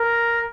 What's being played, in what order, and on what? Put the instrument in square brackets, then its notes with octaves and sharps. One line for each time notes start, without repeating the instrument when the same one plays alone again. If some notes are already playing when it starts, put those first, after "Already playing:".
Already playing: [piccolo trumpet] A#4